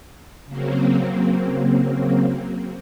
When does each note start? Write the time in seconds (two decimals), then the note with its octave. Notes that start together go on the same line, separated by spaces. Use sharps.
0.46 C#3 F#3 A#3 C4